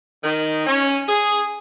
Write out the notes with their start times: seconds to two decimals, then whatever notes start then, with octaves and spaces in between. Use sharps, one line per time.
0.24 D#3
0.67 C#4
1.08 G#4